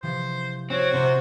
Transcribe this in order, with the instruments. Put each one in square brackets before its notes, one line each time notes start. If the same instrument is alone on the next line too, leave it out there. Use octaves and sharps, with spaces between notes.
[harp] C3 E3 F3 [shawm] C5
[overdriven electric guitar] C4 [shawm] F#4 [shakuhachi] C#5
[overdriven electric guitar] C3 [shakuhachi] C5 [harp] F#5